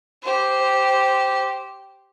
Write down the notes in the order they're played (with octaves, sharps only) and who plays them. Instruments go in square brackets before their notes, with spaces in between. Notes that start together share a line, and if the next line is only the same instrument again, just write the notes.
[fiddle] G4 C5